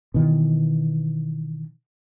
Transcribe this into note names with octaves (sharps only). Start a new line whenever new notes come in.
B2 D#3 E3